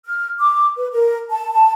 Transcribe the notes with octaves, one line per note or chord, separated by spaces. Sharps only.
F6
D6
B4
A#4
A5
A5